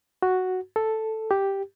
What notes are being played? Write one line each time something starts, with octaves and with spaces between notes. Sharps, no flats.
F#4
A4
G4